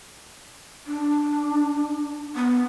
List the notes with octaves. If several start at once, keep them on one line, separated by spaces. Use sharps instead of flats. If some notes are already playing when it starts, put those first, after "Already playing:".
D4
B3